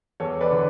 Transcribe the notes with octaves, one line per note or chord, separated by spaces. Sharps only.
E2 A4 C#5
B4 D5
D3